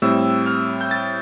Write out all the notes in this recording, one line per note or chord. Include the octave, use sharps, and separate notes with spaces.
A2 G3 C4 E6
F6
G6
A6